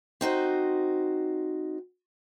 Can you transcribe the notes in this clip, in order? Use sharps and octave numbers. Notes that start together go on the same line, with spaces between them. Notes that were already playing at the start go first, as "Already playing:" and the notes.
C4 D#4 F#4 C5